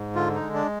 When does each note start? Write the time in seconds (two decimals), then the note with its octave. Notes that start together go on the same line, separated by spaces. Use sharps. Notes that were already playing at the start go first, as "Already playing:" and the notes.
Already playing: G#2
0.15 D3 F4
0.35 D#4
0.41 G#3
0.54 D4